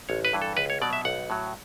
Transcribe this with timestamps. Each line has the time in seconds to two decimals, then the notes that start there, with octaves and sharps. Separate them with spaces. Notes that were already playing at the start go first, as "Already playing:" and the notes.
0.09 A1 C#5
0.25 B4
0.33 G2 E3
0.42 A4
0.57 C#2 B4
0.70 C#5
0.82 B2 F#3 D5
0.93 E5
1.05 B1 F#5
1.30 A2 F#3